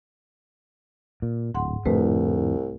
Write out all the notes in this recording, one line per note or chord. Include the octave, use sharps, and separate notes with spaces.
A#2
D1 G#2 F#5 C6
C2 F2 A2 D3 A3 B4